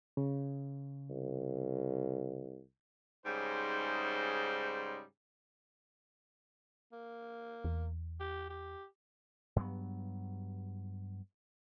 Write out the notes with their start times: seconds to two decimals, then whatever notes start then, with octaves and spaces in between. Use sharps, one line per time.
0.17 C#3
1.10 C2
3.25 G#2 C#3 G3 D#4 C5
6.92 A#3
7.64 E2
8.20 G4
8.50 G4
9.56 G2 F#3 B3